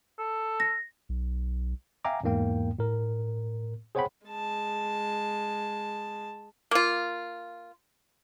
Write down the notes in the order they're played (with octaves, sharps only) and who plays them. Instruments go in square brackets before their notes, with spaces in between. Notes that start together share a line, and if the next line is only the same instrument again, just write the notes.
[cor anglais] A4
[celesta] A#6
[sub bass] B1
[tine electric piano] E5 F5 G5 G#5 A#5 D6
E2 G#2 A#3 G5
A2 A#4
G#4 C5 C#5 F#5 G5 B5
[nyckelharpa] G#3 A5
[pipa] A#3 F4